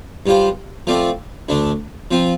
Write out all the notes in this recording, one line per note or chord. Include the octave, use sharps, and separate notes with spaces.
G2 G3 F4 C5
F3 A3 C4 F4 D5
D2 D3 A3 D4
F3 C4 F4